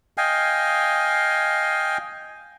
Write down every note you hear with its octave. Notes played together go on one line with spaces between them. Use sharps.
D#5 F5 G5 G#5